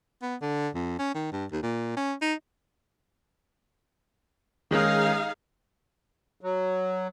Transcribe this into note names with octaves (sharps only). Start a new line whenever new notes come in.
B3
D3
F2
C#4
D#3
G2
D#2
A#2
C#4
D#4
D#3 G#3 C#4 D#4 G#4 F5
F#3